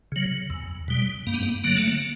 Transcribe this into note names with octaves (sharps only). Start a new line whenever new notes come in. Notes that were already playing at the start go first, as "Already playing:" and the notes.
C#3 F#3
E2
B2 G3
G2 A#3
B3
A#3
D3 F#3 A#3
A3
A#3